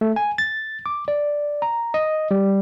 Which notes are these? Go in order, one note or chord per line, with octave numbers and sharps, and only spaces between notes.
A3
G#5
A6
D6
D5
A#5
D#5
G3